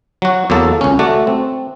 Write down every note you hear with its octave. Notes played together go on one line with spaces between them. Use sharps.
F#3 F#4
E2 F#3 A#3 A4
C#2 C#4
A3 F#4 D5
C4